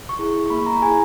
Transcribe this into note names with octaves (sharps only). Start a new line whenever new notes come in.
C#6
E4 G#4
C#6
A#3 B5
A#5
E4 G#4 G#5